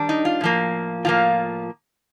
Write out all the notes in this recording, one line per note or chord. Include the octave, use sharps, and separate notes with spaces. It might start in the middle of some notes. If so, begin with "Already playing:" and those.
Already playing: D#3 G3 D4
D#4
F4
A2 F3 A#3
A2 F3 A#3 F4